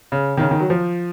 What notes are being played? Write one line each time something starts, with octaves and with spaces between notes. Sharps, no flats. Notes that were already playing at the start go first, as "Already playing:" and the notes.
C#3
D#3
C#3
D#3
F#3
F3